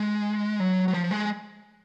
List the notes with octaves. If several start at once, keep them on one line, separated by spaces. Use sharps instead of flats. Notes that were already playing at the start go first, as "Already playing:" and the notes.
Already playing: G#3
F#3
F#3
F3
G#3